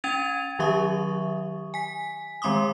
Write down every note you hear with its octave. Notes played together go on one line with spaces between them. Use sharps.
C#4 G5 G#6 A6 D#7 F7
D#3 F#3 G4 E5 C#6 D#6
G#5 B6
D#3 G#3 C4 C6 D6 D#6